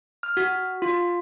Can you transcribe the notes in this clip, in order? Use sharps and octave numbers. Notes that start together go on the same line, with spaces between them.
F6
F#4
F4